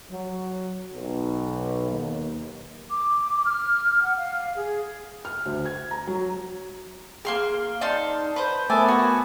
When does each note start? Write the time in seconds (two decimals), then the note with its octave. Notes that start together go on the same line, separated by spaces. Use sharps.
0.10 F#3
0.94 B1
1.91 D#2
2.90 D6
3.45 F6
4.02 F#5
4.17 F5
4.56 G#4
5.25 F6
5.45 D2
5.66 G#6
5.91 A#5
6.07 F#3
7.25 A#3 G#4 C6 F6
7.81 D#4 D5 A5 C6
8.36 B4 C5
8.70 A3 B3 A#4 E5 G#5 A5 D6
8.88 F#4 G#5